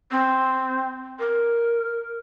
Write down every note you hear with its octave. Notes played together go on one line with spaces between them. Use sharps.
C4
A#4